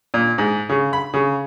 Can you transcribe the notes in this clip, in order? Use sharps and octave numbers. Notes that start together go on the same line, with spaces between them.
A#2
G#2
C#3
B5
C#3